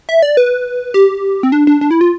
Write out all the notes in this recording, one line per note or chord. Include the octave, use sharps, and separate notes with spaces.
E5
D5
B4
G4
C4
D4
D4
D4
E4
F4